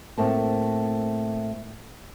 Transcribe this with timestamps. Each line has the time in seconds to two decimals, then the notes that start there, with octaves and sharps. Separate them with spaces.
0.18 A2 A3 A#3 C4 A5